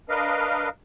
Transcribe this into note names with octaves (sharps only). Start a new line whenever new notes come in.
D4 A#4 B4 D#5 F5